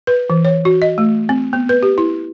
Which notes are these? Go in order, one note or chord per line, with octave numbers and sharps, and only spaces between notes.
B4
E3
C#5
F#4
D#5
A3
C4
B3
B4
G4
E4